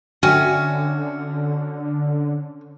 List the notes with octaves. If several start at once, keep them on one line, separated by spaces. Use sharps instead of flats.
D3 C#4 F#4 E5 G5 G#5